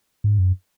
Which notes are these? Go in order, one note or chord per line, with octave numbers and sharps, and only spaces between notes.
G#2
F#2